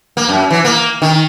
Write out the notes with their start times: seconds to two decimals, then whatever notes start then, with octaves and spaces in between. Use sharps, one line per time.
0.17 A#3
0.29 F#2
0.50 E3
0.65 A#3
1.02 D#3